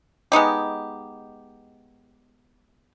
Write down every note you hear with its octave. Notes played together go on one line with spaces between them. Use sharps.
G#3 B3 D#4 G4